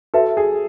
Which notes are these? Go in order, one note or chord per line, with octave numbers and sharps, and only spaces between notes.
F#4 A4 B4 E5
G#4